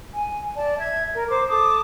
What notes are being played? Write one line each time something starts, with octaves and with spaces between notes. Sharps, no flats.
G#5
D5 A5
E5 G#6
A#4
C5 D6
A4 A5 D6 D#6